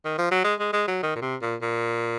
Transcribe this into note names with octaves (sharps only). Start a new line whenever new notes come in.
D#3
F3
F#3
G#3
G#3
G#3
F#3
D#3
A#2
C3
A#2
A#2